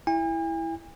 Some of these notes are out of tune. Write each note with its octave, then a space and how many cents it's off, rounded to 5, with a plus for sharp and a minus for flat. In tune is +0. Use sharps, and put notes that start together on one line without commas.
E4 +0 G#5 -45